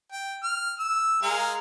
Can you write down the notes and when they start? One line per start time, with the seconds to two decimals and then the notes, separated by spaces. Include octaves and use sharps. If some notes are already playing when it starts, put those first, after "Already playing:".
0.12 G5
0.43 F6
0.79 E6
1.22 G#3 A#4 F5